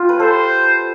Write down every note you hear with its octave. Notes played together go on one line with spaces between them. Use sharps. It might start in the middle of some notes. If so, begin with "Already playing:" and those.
Already playing: F4 G4
B4
A4 C5